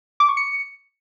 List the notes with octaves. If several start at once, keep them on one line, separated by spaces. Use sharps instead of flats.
D6
C#6
C#7